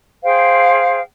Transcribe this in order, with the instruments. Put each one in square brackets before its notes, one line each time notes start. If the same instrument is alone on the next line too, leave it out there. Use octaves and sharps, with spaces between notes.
[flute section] G#4 C5 F5 G5